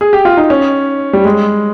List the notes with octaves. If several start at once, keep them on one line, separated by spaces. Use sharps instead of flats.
G#4
G4
F4
D#4
C#4
G3
G#3